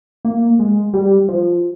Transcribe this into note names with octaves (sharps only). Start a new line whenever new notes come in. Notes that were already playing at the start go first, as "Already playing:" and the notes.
A#3
G#3
G3
F3